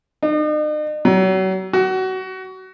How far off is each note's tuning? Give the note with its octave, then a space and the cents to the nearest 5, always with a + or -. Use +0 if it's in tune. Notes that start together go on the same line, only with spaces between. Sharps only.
D#4 -45
F#3 +35
F#4 +25